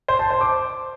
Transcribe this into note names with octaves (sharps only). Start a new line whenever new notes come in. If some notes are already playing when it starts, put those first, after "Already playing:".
C5
A5
C5
D6